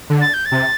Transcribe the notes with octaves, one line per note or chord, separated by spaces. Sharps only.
D3
A6
G6
A6
C3